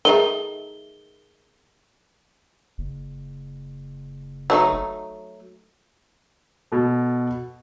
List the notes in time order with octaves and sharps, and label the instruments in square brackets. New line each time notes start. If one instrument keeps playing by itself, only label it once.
[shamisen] D#3 A3 D#4 [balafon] G#4 E5 [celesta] G7
[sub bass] F#1
[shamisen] F#3 A3 D#4
[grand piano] B2 A4